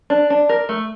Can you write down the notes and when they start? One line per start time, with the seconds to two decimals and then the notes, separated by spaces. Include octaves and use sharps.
0.10 D4
0.30 D4
0.49 A#4
0.69 A3